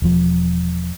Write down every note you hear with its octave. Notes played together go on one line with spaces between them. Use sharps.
E1 F3